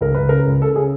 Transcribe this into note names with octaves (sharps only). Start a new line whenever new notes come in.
C#2 A#4
C#2 B4
C#3 A#4
C#2
C#3 A4
C#3 G#4